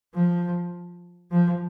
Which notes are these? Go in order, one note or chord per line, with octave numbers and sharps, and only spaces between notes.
F3
F3